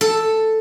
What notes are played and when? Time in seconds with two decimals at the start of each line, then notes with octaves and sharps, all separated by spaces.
0.01 A4